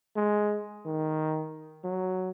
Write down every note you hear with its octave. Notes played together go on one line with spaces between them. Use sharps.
G#3
D#3
F#3